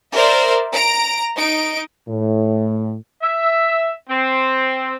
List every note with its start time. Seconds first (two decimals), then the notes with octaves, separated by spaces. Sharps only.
0.14 A#4 C5 D5 E5
0.72 A#5 D7
1.38 D#4 D7
2.08 A2
3.23 E5
4.10 C4